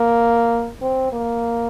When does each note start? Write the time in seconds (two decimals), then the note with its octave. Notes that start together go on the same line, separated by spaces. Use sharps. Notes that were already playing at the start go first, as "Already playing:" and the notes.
Already playing: A#3
0.82 C4
1.12 A#3